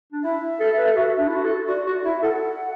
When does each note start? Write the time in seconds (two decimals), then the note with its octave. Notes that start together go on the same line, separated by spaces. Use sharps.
0.12 D4
0.24 E4 E5
0.60 A4
0.78 B4
0.87 A4
0.96 F#4
1.18 D4
1.27 E4
1.35 F#4
1.44 A4
1.68 F#4 D5
1.87 F#4
2.05 E4 E5
2.23 A4 F#5